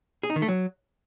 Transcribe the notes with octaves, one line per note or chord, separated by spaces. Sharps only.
G#4
D#4
D#3
A3
F#3